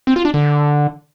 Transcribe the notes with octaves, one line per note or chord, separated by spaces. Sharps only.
C4
F4
D4
D3